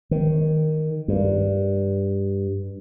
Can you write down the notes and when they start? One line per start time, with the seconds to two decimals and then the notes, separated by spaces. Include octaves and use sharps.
0.11 D#3
1.08 G2